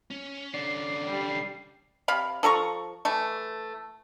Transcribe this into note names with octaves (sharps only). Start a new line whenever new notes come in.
C#4
D3 C#4 D5 C7
G3
C3 F5 B5
F3 A4 A#5 C#6
E3 A3